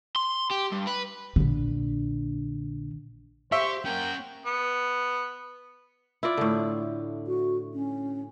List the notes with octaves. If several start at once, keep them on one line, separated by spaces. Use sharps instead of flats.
C6
G4
G2
B4
A#1 D3
G4 C5 E5 C#6
A#3 C#4 F#5 G5
B3
E4 F4 D5
A2 D3
F#4
C#4